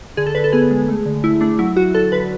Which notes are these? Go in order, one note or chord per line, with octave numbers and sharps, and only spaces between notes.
D3 G#4
A4
D3 B4
A4
B3 G#4
G#3
A3
D3
A3 E4
A3 D4
F#3 E4
F#3 F#4
D3 A4
D3 B4